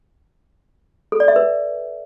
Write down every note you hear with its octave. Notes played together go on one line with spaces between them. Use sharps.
A4
D5
E5
B4